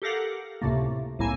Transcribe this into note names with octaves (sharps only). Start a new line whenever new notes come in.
G4 A4 A#4 F5 F#5
C#2 A2 C3 A3 A#3
C2 A2 A#3 E4 G#5